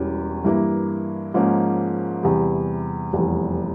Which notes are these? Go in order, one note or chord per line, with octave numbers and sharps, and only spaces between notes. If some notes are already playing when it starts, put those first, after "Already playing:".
Already playing: E1 E2 E3 G3 C#4
G2 E3 A#3 E4
G#2 F3 A#3 C#4
E2 C3 G3
F1 E2 E3 G3